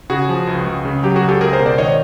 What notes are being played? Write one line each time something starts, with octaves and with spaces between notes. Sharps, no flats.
C#3 F#4 G#4
F3
C#2
C#2
C#3
F#3 G4
F#4 G#4
C#2
G4 A4
C#2 G#4 A#4
A#4 C5
B2
C5 D5
D#3 C#5 D#5